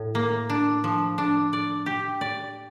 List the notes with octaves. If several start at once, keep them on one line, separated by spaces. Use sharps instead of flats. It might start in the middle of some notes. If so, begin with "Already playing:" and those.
Already playing: A2
A#3
D4
F3
D4
D5
G4
D5